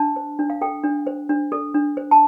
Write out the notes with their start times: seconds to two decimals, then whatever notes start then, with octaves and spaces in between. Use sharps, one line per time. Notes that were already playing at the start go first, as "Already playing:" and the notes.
Already playing: D4 A5
0.16 C5
0.39 D4
0.50 F5
0.61 A4 G5
0.84 D4
1.07 C5
1.29 D4
1.52 A4
1.74 D4
1.97 C5
2.11 A5